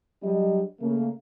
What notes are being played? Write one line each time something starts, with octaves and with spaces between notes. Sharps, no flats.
F#3 G3 D4 G#4 D#5
C#3 A3 A#3